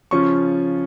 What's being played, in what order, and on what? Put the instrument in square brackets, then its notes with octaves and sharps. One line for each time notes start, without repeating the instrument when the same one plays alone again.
[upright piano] C#3 F3 C#4 F4 C#6